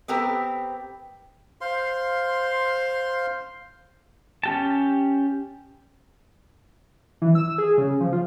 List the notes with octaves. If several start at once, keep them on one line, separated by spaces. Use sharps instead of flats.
B3 C4 G4 A#4
C5 F5 C6
C#4 G4 A5
E3
E6
G#4
C#3
F3
F4